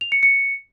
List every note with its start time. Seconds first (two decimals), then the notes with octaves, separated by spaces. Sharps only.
0.01 F7
0.12 C#7
0.23 C#7